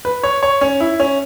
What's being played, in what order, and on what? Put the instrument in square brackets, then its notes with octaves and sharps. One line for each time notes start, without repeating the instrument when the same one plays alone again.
[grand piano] B4
C#5
C#5
C#4
E4
C#4